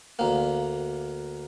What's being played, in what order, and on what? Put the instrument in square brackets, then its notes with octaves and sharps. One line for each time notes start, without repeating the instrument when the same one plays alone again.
[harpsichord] D2 A#3